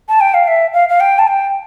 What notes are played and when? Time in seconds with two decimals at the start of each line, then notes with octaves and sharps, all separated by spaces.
0.09 A5
0.21 G5
0.34 F5
0.48 E5
0.73 F5
0.89 F5
1.00 G5
1.19 A5
1.27 G5